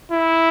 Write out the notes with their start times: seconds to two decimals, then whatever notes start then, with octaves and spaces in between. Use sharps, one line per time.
0.12 E4